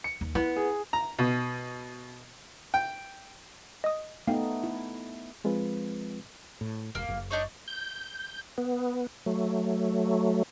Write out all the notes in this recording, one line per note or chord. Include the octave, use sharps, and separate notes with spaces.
C#7
D#2
B3 E4
G#4
A#5
B2
G5
D#5 D#6
A3 B3 D#4 F5 G5
E4
F3 G#3 C4 F4 B4
A2
E1 A#3
F#1
D4 D#4 C#5
G6
B3
F#3 A3